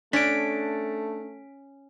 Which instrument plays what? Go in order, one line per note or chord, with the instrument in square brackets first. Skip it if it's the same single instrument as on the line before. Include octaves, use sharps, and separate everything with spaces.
[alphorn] A3 [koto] C#4 [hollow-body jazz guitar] D4 [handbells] B6 D7